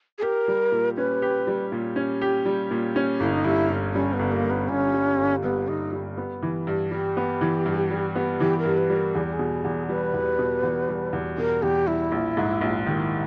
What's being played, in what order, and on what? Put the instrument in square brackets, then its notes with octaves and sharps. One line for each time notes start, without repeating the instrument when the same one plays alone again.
[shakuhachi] G#4
[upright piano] G4 [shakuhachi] A#4
[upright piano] G3
A#2
[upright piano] C#4 [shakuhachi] B4
[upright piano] G4
G3
A#2
C#4
G4
G3
A#2
C#4
[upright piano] G1 [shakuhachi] E4
[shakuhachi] D#4
[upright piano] G2 [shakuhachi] E4
[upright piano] G1
[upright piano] G3 [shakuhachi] C#4
[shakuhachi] B3
[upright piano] G1
[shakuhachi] A#3
[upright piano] G2
[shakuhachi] B3
[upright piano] G1 [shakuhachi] C#4
[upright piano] G3
G1
[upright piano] G2 [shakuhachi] B3
[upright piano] G1 [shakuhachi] D#4
[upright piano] G3
B3
E3
G2
[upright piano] G3 [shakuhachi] G4
[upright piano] B3
E3
G2
G3
B3
[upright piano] E3 [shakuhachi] G4
[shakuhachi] A#4
[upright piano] G2
[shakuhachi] B4
[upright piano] G3
[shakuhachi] A#4
[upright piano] E2 [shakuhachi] G#4
[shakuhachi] G4
G#4
[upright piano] B2
E2
[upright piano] G3 [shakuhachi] B4
[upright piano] E2
B2
E2
G3
E2
[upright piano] B2 [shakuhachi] A#4
[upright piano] E2 [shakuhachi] G4
[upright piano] G3 [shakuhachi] E4
[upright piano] A#1
G#2
A#1
[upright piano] D#3 [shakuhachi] E4